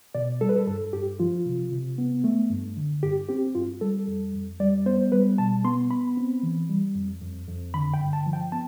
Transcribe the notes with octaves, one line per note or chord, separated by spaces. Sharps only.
B2 D5
G3 A4
B4
A4
G2 A4
G2 G4
F3 F4
C3
C3
B3
A3
G2
D3
G2 G4
C4 G4
G2 F4
G3 A4
F2
F2
G3 D5
B3 C5
G3 B4
B2 A5
B3 C6
B3 B5
C4
E3
G3
F2
F2
F2
D3 B5
G5
G2
A5
F3
G5
B3 A5